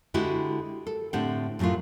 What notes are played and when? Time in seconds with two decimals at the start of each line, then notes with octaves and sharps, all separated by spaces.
0.14 D3 G#3 E4 F#4 G4
0.87 A4
1.13 A2 D3 C4 G4 F#5
1.59 F#2 A2 F#3 A3 F4